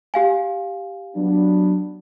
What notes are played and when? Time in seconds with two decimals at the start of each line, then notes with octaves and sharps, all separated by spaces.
0.14 G4 F5 G#5
1.15 F#3 B3 D4